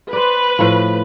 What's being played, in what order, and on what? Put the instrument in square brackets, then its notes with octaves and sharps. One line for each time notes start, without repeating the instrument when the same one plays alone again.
[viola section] B4 [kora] C5 D5
[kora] A2 F3